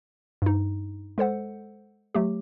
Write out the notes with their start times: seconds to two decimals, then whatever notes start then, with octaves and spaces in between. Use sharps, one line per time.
0.42 G2 D#4
1.18 G#3 A4 C5 F#5
2.14 F#3 A3 G4